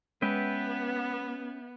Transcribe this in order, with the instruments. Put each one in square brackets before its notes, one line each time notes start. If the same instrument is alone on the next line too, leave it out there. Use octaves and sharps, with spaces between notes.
[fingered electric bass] G#3 [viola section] B3 [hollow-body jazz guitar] C#4 [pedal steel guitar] B4 E5 G5